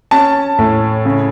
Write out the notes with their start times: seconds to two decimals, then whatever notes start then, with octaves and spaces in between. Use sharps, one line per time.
0.11 C#4 A5
0.59 A2
1.05 C#3